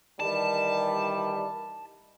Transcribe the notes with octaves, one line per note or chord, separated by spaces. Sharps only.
D#3 E3 G3 A5